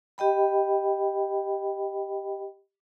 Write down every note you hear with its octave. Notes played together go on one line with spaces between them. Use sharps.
G4 D#5 G5 B5